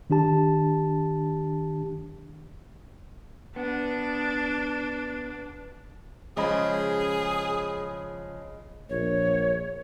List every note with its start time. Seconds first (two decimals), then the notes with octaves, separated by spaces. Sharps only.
0.10 D#3 D4 G4 A5
3.56 B3 D4
6.37 C#3 F3 G#3 G#4 D#5 B5
8.90 A#1 C#5